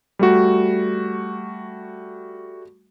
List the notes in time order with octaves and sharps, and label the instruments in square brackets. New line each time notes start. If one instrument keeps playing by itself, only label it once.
[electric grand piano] G3 A3 F#4